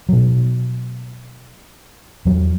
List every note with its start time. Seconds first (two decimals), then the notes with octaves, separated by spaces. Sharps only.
0.09 B2 F#3
2.25 E2 F#3